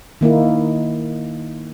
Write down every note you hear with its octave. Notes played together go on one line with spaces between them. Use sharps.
D#3 A#3 D#4 E4